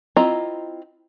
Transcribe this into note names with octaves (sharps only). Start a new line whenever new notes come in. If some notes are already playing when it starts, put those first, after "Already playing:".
C4 E4 F4 D#5 A#5